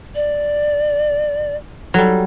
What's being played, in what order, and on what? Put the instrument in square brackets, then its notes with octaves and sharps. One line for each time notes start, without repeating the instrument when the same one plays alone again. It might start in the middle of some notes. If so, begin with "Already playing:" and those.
[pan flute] D5
[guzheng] F#3 G3 [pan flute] A4